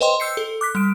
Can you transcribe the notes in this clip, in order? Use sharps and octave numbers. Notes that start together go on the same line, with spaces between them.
B4 C5 D#5 G5 C6
E6 G6 C7 C#7
A4
D6 F#6 B6
G3 D7